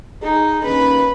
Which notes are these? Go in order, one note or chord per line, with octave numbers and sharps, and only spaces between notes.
D#4 G#4
D#2 C#4 B4